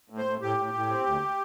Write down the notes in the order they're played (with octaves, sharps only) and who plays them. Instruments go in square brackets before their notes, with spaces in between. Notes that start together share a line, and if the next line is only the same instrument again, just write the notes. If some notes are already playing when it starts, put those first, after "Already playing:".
[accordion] A2
C5
A2
A2 G4
A2
A2
C4
D2